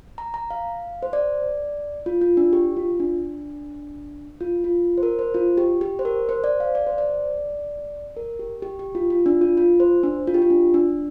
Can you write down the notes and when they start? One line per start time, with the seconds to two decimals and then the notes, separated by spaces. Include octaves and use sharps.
0.18 A#5
0.34 A#5
0.51 F5
1.03 C5
1.13 D5
2.06 F4
2.21 F4
2.37 D4
2.53 G4
2.77 F4
3.00 D4
4.41 F4
4.64 F4
4.98 C5
5.03 A#4
5.19 C5
5.34 F4
5.58 G4
5.81 G4
5.99 C5
6.05 A#4
6.29 C5
6.44 D5
6.60 F5
6.75 D5
6.87 C5
6.98 D5
8.17 A#4
8.39 G4
8.62 G4
8.79 G4
8.95 F4
9.10 F4
9.26 D4
9.41 F4
9.57 F4
9.80 C5
10.03 D4
10.27 F4
10.34 G4
10.42 F4
10.50 D4
10.74 D4